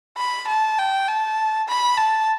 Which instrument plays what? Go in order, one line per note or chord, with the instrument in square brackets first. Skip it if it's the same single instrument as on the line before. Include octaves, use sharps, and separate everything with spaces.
[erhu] B5
A5
G5
A5
B5
A5